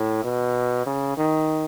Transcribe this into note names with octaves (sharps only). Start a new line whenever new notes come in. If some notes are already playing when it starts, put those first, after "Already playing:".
Already playing: A2
B2
C#3
D#3